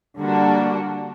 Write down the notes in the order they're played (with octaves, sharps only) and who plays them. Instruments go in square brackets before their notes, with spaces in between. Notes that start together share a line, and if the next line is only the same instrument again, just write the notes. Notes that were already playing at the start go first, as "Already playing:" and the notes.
[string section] D3 G3 A#3 D4 F#4